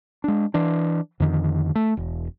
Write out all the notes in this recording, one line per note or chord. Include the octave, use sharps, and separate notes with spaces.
G#3 D4
E3 D4
F2 D3 D#3
A3
E1